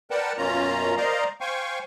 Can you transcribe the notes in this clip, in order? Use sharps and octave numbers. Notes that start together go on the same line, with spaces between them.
A#4 B4 D5 F#5 G5 A5
F#2 B2 A#3 C#4 F4 A#5
A#4 C5 D5 D#5 F5 A#5
C5 F5 G5 G#5 C#6